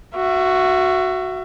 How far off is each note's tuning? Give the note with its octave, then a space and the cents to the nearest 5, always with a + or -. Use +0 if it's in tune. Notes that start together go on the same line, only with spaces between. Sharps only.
F#4 +0 E5 +30